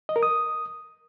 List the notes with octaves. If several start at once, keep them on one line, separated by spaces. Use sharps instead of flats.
D#5
A#4
D#6